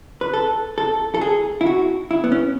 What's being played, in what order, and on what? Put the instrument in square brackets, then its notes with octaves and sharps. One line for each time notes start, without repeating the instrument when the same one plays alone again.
[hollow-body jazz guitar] B4
A4
A4
A4
G#4
E4
F#4
E4
B3
C#4